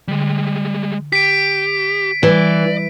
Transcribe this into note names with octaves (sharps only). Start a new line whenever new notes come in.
D3 G3 G#3
G4 B6 D7
E3 G3 D5